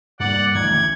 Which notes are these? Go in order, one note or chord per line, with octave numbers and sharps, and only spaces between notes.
G2 A#3 D5 F#5
A1 D2 D#3 G#6